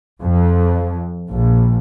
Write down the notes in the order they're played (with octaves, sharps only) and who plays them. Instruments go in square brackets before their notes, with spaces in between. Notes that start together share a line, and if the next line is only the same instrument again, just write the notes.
[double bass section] F2
A#1